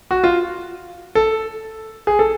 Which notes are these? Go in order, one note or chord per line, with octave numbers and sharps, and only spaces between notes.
F#4
F4
A4
G#4
A4